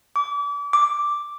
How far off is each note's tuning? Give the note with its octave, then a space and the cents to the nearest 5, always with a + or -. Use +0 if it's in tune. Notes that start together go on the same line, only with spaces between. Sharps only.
D6 -35
D6 +0